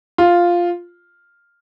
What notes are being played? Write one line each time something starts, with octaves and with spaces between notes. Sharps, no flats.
F4